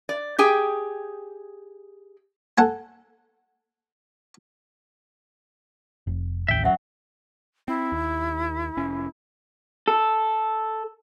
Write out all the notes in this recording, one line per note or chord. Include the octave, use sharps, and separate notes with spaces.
D5
G4 G#4 G5
A4 F#5 G#5
F1
A1 D#2 E5 G5
F#2 F#3 E5 F#5
C4 E4
D#2
F1 C#4
A4